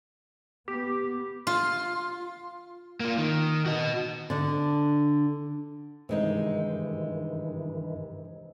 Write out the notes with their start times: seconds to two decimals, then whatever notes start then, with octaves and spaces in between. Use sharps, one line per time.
0.68 B3 G4
1.47 F4
3.00 A#3 F4
3.18 D#3
3.66 F#4 D#5
4.30 D3 D4
6.09 G2 C3 D#3 E3 G#3 D#4